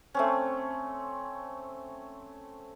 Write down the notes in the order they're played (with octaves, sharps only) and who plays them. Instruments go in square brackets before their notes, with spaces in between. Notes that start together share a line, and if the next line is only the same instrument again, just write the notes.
[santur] A3 C4 C#4